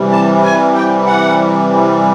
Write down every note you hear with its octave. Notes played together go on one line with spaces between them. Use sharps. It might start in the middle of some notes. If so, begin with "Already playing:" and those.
Already playing: C3 E3 G3
A5
G#5
G5
F#5